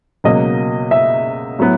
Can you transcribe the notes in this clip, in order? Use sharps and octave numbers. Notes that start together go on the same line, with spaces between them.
C#2 B2 F#3 A#3 D#5
E5
A2 F#3 B3